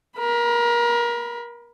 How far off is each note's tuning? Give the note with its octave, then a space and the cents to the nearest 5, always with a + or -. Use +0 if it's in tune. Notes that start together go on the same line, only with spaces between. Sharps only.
A#4 +30 B5 +0